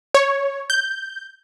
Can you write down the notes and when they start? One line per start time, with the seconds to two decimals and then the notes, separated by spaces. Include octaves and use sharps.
0.14 C#5
0.70 G6